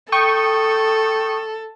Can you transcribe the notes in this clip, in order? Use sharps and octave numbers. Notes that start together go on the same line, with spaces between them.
A4 G5 C#6 D#6